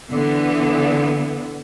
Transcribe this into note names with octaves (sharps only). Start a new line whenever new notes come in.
D3 E3 B3